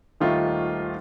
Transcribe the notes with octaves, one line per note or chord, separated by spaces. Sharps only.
D#1 D#3 A3 F4